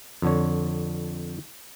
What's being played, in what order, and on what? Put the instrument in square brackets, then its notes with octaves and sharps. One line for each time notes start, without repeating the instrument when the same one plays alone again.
[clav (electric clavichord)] F2 D3 C#5